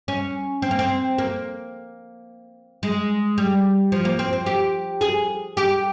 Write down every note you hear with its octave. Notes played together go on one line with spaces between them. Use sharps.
C#4
C4
A#3
C4
A#3
G#3
G3
F3
A#3
C4
C4
G4
G#4
G4